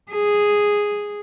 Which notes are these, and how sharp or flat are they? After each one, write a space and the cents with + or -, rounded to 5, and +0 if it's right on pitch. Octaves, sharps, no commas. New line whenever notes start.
G#4 -5